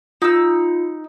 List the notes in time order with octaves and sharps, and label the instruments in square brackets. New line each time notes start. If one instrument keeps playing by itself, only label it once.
[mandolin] D#4 E6 [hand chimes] F4